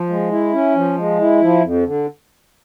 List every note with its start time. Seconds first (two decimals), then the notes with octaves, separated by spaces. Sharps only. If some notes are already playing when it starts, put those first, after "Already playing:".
Already playing: F3
0.10 G#3
0.31 E4
0.53 C#4
0.76 F3
0.98 G#3
1.20 E4
1.42 F3
1.64 F2
1.86 D3